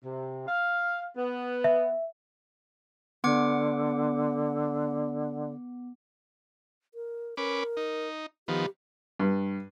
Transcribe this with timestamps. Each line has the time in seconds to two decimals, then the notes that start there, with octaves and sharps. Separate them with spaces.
0.05 C3
0.48 F5
1.17 B3
1.64 E5
3.24 D3 B3 F#5 D6
6.94 A#4
7.37 C#4 A#4 B4 D6
7.77 D#4
8.48 D#3 F3 B3 G4
9.20 G2